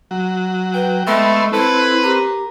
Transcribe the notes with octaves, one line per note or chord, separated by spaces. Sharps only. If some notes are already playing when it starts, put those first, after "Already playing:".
F#3
B4 G5
G#3 A3 B3 E5 C6
C4 E4 A4 B4
G4 A#4